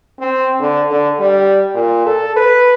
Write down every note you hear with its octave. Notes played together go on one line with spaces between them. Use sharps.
C4
D3
D3
G3
A#2
A4
B4